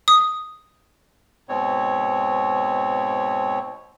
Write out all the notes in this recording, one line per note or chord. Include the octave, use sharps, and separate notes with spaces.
D#6
G#2 B2 C4 C#5